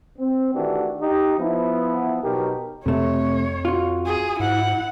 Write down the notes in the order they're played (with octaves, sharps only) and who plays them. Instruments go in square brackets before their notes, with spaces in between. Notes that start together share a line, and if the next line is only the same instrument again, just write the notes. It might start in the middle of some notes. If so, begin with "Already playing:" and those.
[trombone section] C4
D#3 E3 A3 D4 F#4 G4
D#4 G4
F3 B3 E4
B2 F#3 D#4 G4 A#4
[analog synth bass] F2 [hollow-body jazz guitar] C3 A3 [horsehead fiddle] C#5
[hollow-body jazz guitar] F4 F#4
[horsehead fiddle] G#4
[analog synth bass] G#2 [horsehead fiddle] E4 F#5